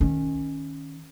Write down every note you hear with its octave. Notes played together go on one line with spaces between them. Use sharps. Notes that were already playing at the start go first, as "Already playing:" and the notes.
D#3 C#4